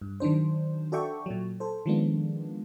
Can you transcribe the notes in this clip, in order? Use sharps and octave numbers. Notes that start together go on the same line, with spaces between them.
G2
D#3 F#3 D4 C5
F#4 A4 D5 E5 G5 C#6
A#2 F#3
A4 C5
D#3 F3 G#3 A#3 B3 D4